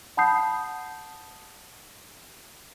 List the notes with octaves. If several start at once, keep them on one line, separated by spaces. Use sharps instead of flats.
F#5 A5 B5 D#6 G6 C7